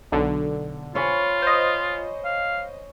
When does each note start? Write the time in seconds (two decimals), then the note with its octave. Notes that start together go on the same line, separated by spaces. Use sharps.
0.12 B1 D3
0.95 F4 C#5 G#5 B5
1.42 C5 D#5
2.25 F5